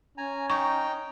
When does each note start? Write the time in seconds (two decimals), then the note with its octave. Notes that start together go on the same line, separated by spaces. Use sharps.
0.18 C#4 G#5 A#5
0.50 D#4 G5 A#5 C#6